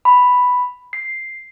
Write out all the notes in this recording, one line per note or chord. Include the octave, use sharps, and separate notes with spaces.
B5
C7